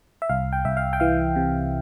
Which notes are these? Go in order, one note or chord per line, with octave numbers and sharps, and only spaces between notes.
E5
C2 F5
G5
C2 E5
F5
G5
E3 F5
C3